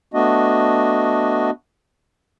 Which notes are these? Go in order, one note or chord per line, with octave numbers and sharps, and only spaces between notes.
A3 B3 D4 F#4 D#5